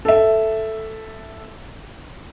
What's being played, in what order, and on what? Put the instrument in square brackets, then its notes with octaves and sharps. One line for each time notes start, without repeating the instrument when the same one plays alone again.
[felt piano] A4 E5